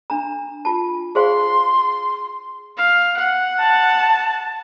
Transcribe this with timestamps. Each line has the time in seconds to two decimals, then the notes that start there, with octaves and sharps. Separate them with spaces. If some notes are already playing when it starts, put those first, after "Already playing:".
0.10 D4 A#5
0.65 F4 A5
1.15 G#4 C5 F5 C6
2.77 F5
3.17 F#5
3.60 A5